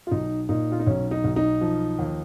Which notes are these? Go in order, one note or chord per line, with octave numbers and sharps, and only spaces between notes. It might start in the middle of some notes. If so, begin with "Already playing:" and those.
F4
B1 D#4
A#2 D#4
F4
D#4
B1 C#4
D#4
B1
D#4
F3
D#2